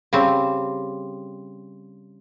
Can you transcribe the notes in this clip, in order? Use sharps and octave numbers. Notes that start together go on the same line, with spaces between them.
C#3 G3 C4